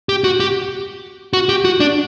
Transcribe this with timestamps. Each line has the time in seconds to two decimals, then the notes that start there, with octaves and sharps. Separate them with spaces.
0.09 G4
0.24 F#4
0.40 G4
1.33 F#4
1.49 G4
1.65 F#4
1.80 D4